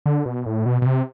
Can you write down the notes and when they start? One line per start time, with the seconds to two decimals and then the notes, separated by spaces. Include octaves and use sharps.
0.06 D3
0.26 B2
0.46 A2
0.66 B2
0.82 B2
0.86 C3